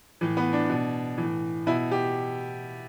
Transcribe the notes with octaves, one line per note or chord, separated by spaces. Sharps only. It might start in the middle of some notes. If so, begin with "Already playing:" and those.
A2 E3
B3
D4
B2
A2 E3
B2 E4
G4